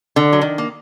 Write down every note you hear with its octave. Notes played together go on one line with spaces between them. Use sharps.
D3
F#3
D#3
A#3